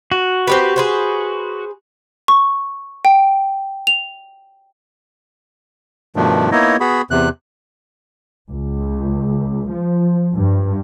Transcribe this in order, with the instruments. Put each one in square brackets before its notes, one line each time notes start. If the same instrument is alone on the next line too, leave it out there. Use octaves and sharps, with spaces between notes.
[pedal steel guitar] F#4
[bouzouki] C4 G4 B4
G#4 B4 C5
[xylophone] C#6
G5
F7
[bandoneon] G2 B2 D#3 F3 A3 D4
A#3 B3 D#4 E4 C#5 D#5
B3 F#4 G#4 B5
E2 C3 F#6
[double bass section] C#2
F3
G2